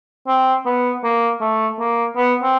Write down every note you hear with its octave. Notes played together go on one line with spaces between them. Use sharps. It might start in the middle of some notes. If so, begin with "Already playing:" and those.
C4
B3
A#3
A3
A#3
B3
C4